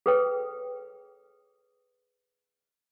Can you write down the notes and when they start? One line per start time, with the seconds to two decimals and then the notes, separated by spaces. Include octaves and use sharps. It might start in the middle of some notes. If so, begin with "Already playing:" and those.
0.06 G#4 A4 B4 C#5 G5